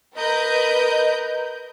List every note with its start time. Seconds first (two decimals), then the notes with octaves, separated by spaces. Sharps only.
0.16 A#4 B4 D#5 G6